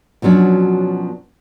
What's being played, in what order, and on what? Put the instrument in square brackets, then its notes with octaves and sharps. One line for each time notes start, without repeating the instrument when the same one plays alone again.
[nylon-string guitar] B2 F3 F#3 C#4 D4